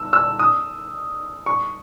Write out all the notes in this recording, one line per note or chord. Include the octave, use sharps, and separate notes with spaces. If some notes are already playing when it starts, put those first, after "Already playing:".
Already playing: E6
E6
D#6
C#6